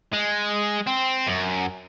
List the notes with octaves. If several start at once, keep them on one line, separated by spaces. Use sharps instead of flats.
G#3
C4
F#2